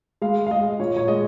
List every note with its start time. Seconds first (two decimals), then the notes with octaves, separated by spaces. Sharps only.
0.22 G#3 F5
0.47 F5
0.51 G#3 D#5
0.79 A#2 C#5
0.97 C#5
1.08 G#3 D#5